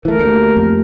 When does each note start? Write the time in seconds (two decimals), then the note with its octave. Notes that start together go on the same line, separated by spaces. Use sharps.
0.05 E3 A3 A#4
0.19 D2 A3 A#3 G4
0.57 F2